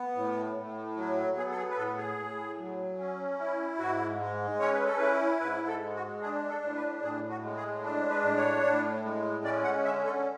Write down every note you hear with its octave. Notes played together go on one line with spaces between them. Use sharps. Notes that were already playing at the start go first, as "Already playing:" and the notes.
Already playing: B3
A2
A2
F#3
B3 G#4
A4
G#4
B4
A2 A4
G#4
A2
F#3
C#4
E4
G#2 F#4
G#3
C#4 C#5
B4
A4
E4 B4
G#2 B4
A4
G#3
F#4
D4 G#4
A4
A2
B4
A2 G#4
F#4
G#3
G#4
D4
B4
A2
C#5
A2
G#3
C#4 D5
F#5
D3 E5
A4